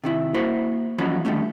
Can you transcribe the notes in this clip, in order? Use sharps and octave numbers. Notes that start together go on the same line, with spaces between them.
C3 D#3 E4
A#3 E4 F#4 C5 B5
E2 F3 F#3 C#4 D#4 B5
D3 D#3 G3 A3 C#4